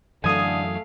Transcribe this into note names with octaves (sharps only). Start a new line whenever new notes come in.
F#2 D3 E3 F#3 A3 F5 G#5 D#6